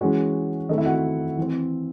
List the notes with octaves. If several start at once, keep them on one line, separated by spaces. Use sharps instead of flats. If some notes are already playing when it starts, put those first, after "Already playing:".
E3 G#3 C#4 F#4 F#5
D#3 A3 C4 D#4 D#5
E4 E5
F#4 F#5
E3 C4